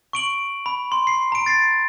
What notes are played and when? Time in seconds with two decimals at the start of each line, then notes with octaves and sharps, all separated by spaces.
0.13 C#6 D7 F#7
0.66 B5
0.92 C6
1.07 C7
1.32 A#5 D7
1.46 A6 C7